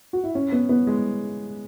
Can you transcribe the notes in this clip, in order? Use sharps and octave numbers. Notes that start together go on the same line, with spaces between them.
F#4
E4
C#4
B3
B3
G#3